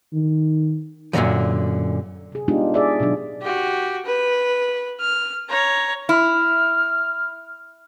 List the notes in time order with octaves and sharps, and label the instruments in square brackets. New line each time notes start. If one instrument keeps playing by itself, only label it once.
[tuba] D#3
[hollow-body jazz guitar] F#2 A#2 D3 D#3 F3
[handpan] C3 G#4
G#3 B3 D4 D#4 F4 G4
G#4 D5 E5
B2 D3 F#3 D4
[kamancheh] F#4 G4
B4
F6
C#5 A#5
[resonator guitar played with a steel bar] E4 [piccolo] F6